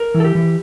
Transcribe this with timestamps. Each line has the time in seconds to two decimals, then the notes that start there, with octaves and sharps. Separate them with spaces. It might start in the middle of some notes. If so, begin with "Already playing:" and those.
Already playing: A#4
0.14 E3
0.20 A4
0.24 G4
0.35 E3